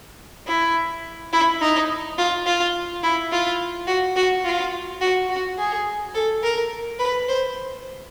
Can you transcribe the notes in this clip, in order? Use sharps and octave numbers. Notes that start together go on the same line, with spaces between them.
E4
E4
D#4
F4
F4
E4
F4
F#4
F#4
F4
F#4
F#4
G#4
A4
A#4
B4
C5